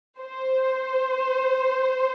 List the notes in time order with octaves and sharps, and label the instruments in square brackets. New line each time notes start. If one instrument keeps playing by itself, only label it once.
[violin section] C5